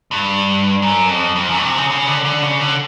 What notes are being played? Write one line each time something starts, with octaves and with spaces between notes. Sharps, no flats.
G2
F#2
F2
F2
F#2
C3
C#3
C#3
D3
D3
C#3
D3